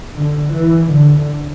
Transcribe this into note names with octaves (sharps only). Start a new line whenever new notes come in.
D3
E3
D3